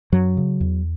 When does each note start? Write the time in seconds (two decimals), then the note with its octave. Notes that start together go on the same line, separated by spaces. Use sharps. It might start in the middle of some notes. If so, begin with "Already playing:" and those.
0.12 F#2 F#3
0.37 C#3
0.61 E2